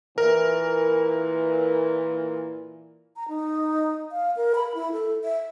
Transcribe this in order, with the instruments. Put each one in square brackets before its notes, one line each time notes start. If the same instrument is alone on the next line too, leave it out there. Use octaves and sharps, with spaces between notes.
[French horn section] A#2 E3 [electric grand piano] A#4
[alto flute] A#5
D#4
F5
A#4
B5
E4
A4
E5